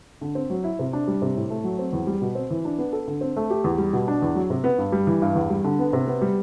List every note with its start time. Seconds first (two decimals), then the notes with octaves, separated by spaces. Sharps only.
0.21 D3
0.35 C4
0.50 F#3
0.64 E4
0.79 C3
0.93 D4
1.08 G3
1.22 C3
1.36 A2
1.50 A3
1.64 F#3
1.79 C4
1.93 E2
2.07 G3
2.22 B2
2.35 C4
2.51 E3
2.65 D4
2.79 B3
2.93 A4
3.07 D3
3.21 C4
3.36 A3
3.50 G4
3.64 E2
3.78 G3
3.93 B2
4.08 D4
4.22 E2
4.35 F#3
4.50 C3
4.64 B3
4.78 G2
4.92 G3
5.07 E3
5.22 G2
5.35 E2
5.50 G3
5.64 D3
5.79 B3
5.93 C3
6.07 B3
6.22 G3